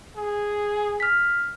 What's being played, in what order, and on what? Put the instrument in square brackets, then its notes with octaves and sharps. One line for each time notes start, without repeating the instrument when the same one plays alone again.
[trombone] G#4
[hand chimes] F6 B6